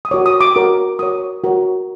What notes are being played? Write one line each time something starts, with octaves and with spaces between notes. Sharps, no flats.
D#6
F#4 A#4 C#5 D6
D#6
D6
F#4 A#4 C#5
F#4 A#4 C#5 D#6
F#4 A#4 C#5